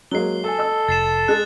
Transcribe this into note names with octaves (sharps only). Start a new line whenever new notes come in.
F#3 G#3 A#3 C7 G7
A4 G#5 A5
D#5 E6
F1 A6 C7 E7
G#3 G#4 F#6 A6